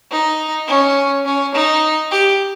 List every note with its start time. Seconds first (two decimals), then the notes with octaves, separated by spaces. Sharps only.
0.11 D#4
0.68 C#4
1.25 C#4
1.54 D#4
2.11 G4